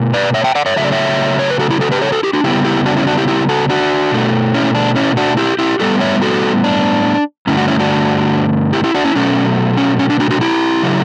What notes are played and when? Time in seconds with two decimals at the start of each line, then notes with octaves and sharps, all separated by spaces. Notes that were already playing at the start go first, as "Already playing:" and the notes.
Already playing: B2 A3
0.14 B4 D5
0.34 C#5 E5
0.44 E5 G5
0.55 D5 F#5
0.66 C#5 E5
0.76 C#3 F#3 A3 E5
0.84 D5
0.92 C#5 E5
1.39 C#5
1.50 B4
1.60 F#4 A4
1.71 E4 G4
1.81 F#4 A4
1.92 G4 B4
2.02 A4 C#5
2.12 F#4 A4
2.23 E4 G4
2.33 D4 F#4
2.44 C#3 G3 B3 E4 G4
2.65 E4 G4
2.86 D4 F#4
2.96 C#4 E4
3.07 D4 F#4
3.18 E4 G4
3.28 E4 G4
3.49 F#4 A4
3.69 D4 F#4
4.12 B2 A3
4.54 C#4 E4
4.75 D4
4.96 C#4 E4
5.17 D4 F#4
5.37 E4 G4
5.59 E4 G4
5.80 A2 G3 B3 F#4 A4
6.00 C#5 E5
6.22 F#4 A4
6.64 D4
7.47 G2 D3 A3 C#4 E4
7.57 D4 F#4
7.68 C#4 E4
7.79 D4 F#4
8.73 E4 G4
8.84 E4 G4
8.94 D4 F#4
9.04 C#4 E4
9.15 B2 F#3 A3 C#4
9.77 C#4
9.99 C#4
10.10 D4
10.20 D4 F#4
10.30 D4 F#4
10.41 E4 G4
10.83 C#3 F#3 A3